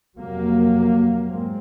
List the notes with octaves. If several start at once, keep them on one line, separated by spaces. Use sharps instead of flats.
F2 C3 F#3 A#3
G#2 G#3 C4